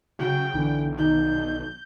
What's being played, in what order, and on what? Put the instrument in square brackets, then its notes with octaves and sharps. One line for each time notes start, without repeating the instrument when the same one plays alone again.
[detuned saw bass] C#3 [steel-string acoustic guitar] F#3 F#4 [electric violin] G5
[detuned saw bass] B1 [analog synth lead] D3 [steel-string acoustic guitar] E3
[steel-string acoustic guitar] D#3 A4 D5 [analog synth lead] D#4 [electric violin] G6